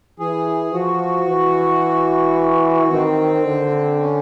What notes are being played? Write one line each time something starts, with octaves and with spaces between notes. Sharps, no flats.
E3 G#4
F3 F#4
E3
D#3 C4
D3
C#4